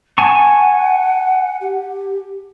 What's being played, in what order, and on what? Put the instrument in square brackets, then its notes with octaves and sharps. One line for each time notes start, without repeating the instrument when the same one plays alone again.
[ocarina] F#5 [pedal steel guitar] G#5 A5 C#6
[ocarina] G4